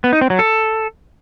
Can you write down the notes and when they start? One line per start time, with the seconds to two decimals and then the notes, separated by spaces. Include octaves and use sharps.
0.04 B3
0.13 D#4
0.21 C4
0.30 F#3
0.39 A4